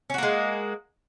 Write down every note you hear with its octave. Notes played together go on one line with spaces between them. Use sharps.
G#3 A#3 C#4 F#4